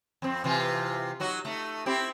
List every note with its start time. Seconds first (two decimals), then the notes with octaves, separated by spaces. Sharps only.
0.22 F2 C4
0.44 C3 E3 F4
1.20 F#3 D#4 F#4
1.45 A3 D#4
1.86 C4 E4 G4